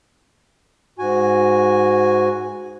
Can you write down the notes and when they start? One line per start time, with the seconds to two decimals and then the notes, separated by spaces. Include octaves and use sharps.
0.99 G#2 F#4 G#5